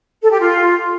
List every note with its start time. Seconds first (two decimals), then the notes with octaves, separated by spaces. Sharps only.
0.23 A4
0.32 G4
0.41 F4